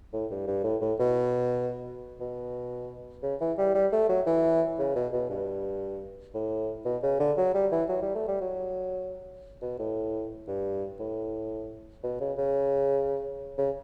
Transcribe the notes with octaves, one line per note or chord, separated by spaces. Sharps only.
A2
G2
G2
A2
A2
B2
B2
C#3
E3
G3
G3
A3
F#3
E3
C#3
B2
B2
G2
A2
B2
C#3
D3
F#3
G3
E3
F#3
G3
A3
G3
F#3
B2
A2
G2
A2
B2
C#3
C#3
C#3